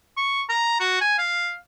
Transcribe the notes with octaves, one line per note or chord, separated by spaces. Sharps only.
C#6
A#5
F#4
G#5
F5